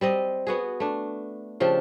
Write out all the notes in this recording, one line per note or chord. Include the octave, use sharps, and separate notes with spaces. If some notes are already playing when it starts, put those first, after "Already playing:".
G3 C4 D#5
B3 F#4 G#4
A3 D4
C#3 F3 D4 G4